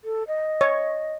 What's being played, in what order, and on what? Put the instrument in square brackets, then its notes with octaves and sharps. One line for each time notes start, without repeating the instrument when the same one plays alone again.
[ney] A4
D#5
[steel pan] C#5